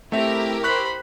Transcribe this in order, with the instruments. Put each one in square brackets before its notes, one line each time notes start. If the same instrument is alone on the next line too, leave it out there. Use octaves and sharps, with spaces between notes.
[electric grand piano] A3 C4 E5 [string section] E4 G4 A#4 [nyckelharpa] A#5
[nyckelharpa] C5 B5 [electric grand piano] C#6 F#6 B6